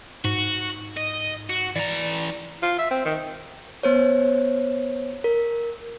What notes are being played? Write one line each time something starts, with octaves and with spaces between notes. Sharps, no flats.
G#2 F#4
D#5
F#4
E3 D5 A#5
F4
E5
C4
D#3
B3 C5 C#5
A#4